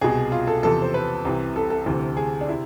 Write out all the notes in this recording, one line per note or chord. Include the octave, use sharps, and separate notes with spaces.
C2 B2 G#4
F4
A4
E2 C3 F3 A4
C5
B4
C2 C3 E3
A4
A4
D2 C3 E3
G#4
D4
C3 E4